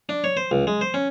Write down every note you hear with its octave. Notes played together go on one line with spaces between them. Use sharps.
D4
C#5
C5
C#2
G#3
C5
C#4